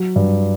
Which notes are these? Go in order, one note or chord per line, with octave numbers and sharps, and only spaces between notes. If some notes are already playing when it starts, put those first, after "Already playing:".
Already playing: F#3
G2